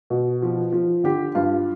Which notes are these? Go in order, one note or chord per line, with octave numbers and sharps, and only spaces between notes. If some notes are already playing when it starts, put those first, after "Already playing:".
B2
F3
F3
D3 G4
G2 F4